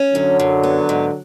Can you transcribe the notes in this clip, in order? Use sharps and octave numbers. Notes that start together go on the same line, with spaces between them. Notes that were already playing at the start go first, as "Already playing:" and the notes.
Already playing: C#4
F#2 D3 F#3
F#2
B3
G#2